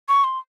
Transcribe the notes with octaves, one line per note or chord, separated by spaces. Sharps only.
C#6
C6